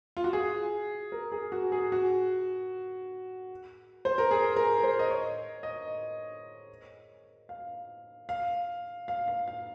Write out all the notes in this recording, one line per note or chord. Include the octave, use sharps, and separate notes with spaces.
F4
F#4
G#4
A#4
G#4
F#4
G#4
F#4
C5
A#4
G#4
A#4
C5
D#5
C#5
D#5
F5
F5
F5
F5
F5